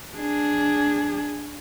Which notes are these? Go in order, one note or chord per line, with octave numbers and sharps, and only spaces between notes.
D4 G#4